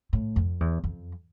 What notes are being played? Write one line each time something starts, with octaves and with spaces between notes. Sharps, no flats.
A2
F2
E2
F2